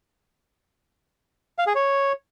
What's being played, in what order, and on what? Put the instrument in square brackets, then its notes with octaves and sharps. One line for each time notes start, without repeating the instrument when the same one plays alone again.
[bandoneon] F5
G#4
C#5